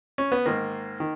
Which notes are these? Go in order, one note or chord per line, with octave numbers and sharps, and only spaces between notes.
C#4
B3
G#2 D#3 A#3
D#3